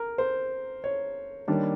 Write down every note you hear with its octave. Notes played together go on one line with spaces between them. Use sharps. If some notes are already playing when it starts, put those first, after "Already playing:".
Already playing: A#4
C5
C#5
D#3 G3 A#3 D4 C#5